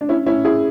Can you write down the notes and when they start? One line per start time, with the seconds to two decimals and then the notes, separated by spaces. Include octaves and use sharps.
0.01 D4
0.09 C#4 E4
0.26 C#4 E4
0.45 E4 G#4